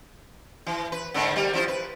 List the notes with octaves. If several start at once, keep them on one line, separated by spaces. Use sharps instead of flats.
E3
B4
G#2 D3 A#3
G3 A#3
F3 E4 C5
B4